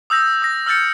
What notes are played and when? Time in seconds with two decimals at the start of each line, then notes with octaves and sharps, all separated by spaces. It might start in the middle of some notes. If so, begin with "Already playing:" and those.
0.10 D#6 E6 G6 A#6
0.42 D#6 A#6
0.66 E6 F6 G6 A6 C#7